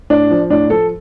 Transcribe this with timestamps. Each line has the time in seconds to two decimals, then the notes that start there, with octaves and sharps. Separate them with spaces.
0.10 A2 D4
0.30 F3
0.50 A2 D4
0.70 F3 A4